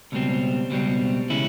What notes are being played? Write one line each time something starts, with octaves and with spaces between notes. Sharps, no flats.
C#2 B2 G3 C4
C#2 B2 G3 C4
C#3 E3 G#3 C#4 E4